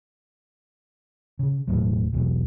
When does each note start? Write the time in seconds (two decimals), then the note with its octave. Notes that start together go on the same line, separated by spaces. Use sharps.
1.39 C#3
1.67 E1 E2 A2 F#3
2.13 E1 B1 E2